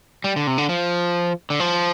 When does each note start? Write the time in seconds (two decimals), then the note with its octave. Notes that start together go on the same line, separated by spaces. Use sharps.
0.24 G3
0.36 D3
0.47 C3
0.58 D3
0.69 F3
1.50 D3
1.60 F3